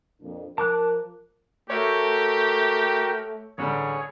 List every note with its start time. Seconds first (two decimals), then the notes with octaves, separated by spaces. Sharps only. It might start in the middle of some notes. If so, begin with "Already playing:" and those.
0.21 F2 A#2 D4
0.58 F3 A#4 A5 D6 F#6
1.70 A3 F#4 G4 A#4 C#5 E5 G5
3.58 A1 D3 G3 G#4 C#5